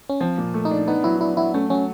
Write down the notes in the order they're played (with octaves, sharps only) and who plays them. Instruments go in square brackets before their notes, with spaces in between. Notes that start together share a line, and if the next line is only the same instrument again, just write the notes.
[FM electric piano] C#4
[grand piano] F3 [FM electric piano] C4
[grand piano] A#2
A3
[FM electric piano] D#4
[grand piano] D4
[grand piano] B3 [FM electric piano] D#4
[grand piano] F#3 [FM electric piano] E4
[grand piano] D4 [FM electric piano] E4
[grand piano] F#3 [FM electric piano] E4
[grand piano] A3 [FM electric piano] C#4
[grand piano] F#3 [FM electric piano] C#4